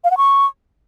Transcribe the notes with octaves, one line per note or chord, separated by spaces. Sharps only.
F5
F#5
C#6